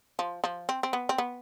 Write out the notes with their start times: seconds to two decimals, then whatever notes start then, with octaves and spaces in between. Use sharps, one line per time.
0.19 F3
0.44 F3
0.69 C4
0.83 C4
0.93 B3
1.09 C4
1.18 B3